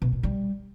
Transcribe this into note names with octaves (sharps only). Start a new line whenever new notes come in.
B2
A#2
G3